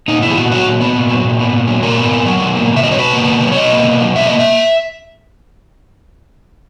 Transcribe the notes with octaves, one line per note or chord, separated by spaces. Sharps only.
A#2 D#4
B3 E4
G#4
A#2 F#4
F#3 F#4
A#2
B3
A#2
F#3
A#2
B3
A#2
F#3
A#2 A#4
B3
A#2
F#3
B2
A#3
B2
E5
F#3 D#5
C#5
B2 B4
A#3
B2
F#3
C#5
B2 D#5
A#3
B2
F#3
B2 E5
A#3 D#5
E5